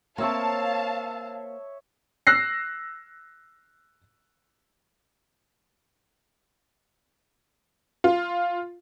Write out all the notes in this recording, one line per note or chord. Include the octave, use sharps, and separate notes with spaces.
A#3 C4 C#5 E5 F5 A5 C#6
E6 F#6 A#6 C7
F4